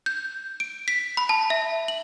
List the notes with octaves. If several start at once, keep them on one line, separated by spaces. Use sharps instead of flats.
G6
D7
B6
B5
A5
E5
F#7